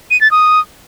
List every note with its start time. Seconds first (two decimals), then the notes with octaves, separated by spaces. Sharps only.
0.11 D#7
0.21 A6
0.31 D#6